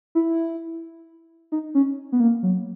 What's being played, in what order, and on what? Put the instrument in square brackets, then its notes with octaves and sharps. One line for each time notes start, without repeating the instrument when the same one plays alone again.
[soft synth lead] E4
D#4
C#4
B3
A#3
F#3